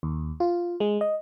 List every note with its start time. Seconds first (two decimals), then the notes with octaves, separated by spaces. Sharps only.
0.03 D#2
0.40 F4
0.80 G#3
1.01 D#5